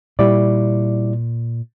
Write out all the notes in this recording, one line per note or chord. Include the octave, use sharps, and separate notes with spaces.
A#2 G3 E4 D5